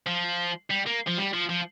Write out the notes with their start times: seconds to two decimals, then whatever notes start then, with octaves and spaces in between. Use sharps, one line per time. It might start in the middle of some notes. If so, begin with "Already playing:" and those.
0.07 F3
0.70 G3
0.86 A#3
1.07 F3
1.17 G3
1.33 F3
1.49 F3